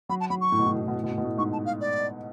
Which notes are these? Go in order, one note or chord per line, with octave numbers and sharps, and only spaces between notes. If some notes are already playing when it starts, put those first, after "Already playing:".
F#3 B5
A5
F#3 B5
C#6
A2
B2
A2
B2
A2
B2
A2
B2
A2
B2
A2
G#2 C#6
A5
F5
D5